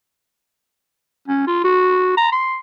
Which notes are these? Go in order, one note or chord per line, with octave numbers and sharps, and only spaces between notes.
C#4
F4
F#4
A#5
C6